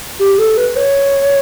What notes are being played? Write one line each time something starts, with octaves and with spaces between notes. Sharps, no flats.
G4
A4
B4
C#5